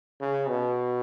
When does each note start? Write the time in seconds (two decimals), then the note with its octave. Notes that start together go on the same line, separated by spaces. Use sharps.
0.20 C#3
0.48 B2